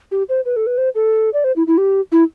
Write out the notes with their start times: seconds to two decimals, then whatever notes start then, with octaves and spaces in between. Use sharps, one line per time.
0.11 G4
0.29 C5
0.45 B4
0.56 A4
0.67 B4
0.78 C5
0.95 A4
1.33 D5
1.44 C5
1.56 E4
1.67 E4
1.78 G4
2.12 E4